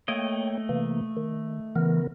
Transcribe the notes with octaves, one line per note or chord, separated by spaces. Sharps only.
A3 A#3 C#5 D#5 G5
C3 E3 A#3
D#3
C#3 E3 B3 A#4